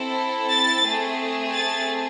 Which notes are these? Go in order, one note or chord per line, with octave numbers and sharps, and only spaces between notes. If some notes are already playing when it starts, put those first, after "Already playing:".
Already playing: C4 E4 A4
A6
A3 C4 G#4
A6